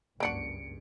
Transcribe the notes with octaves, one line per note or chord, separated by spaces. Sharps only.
F#1 C#2 G2 A#3 D4 F#4 C#7 D7